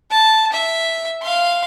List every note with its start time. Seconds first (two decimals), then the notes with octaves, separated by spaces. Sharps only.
0.11 A5
0.52 E5
1.22 F5 C6